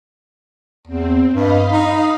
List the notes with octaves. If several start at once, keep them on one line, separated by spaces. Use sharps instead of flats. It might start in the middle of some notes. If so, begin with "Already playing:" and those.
E2 C4
G2 D#5 F5 B5
D#4